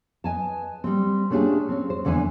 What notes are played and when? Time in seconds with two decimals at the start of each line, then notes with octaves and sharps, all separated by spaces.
0.24 B4 D#5 G#5 A5
0.84 G3 C4
1.30 A3 C#4 D4 F4 G4 G#4
1.69 C4 C#4
1.90 C5
2.05 E2 D3 E3 D4 G#5